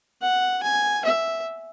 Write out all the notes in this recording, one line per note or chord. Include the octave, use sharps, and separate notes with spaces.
F#5
G#5
E5